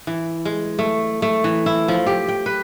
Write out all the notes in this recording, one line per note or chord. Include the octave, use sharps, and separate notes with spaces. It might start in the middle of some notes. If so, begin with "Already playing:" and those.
E3
G#3
A3
A3
E3
E4
F3
G4
G5
B4